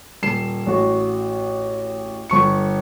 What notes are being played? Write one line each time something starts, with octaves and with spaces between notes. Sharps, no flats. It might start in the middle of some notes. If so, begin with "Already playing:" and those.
D#1 C7 E7
A1 F#4
G1 C#6 C#7